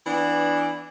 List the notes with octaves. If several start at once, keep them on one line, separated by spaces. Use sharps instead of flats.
E3 B3 D4